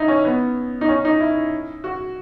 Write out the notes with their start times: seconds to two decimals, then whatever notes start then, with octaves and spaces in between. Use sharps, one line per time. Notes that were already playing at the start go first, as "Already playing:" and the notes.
Already playing: D#4 E4
0.08 C#4
0.25 B3
0.81 D#4
0.89 C#4
1.05 D#4
1.20 E4
1.84 F#4